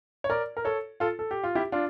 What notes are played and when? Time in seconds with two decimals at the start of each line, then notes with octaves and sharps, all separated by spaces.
0.24 C#5
0.30 A#4 D5
0.57 A#4
0.65 A4 C#5
1.00 F4 A4
1.19 A4
1.31 G4
1.44 F4
1.55 E4 G4
1.72 D4 F4